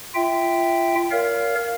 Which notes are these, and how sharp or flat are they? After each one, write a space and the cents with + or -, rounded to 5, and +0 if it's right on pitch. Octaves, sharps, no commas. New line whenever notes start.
F4 -30 E5 +0 G5 +0
A#4 +0 C#5 +45 F5 +0